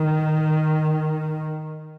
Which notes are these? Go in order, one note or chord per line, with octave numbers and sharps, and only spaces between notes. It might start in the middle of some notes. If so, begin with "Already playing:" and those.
Already playing: D#3